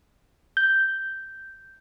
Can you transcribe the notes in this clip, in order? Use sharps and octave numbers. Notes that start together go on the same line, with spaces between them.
G6